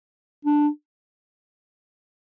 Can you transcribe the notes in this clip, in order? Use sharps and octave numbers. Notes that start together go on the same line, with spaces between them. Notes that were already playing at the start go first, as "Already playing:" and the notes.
D4